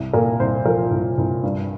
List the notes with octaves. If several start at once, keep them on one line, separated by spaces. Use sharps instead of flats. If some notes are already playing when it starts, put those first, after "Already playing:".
Already playing: C2
A#2 A#4
C2 C5
F3 A#4
C2
C2
G2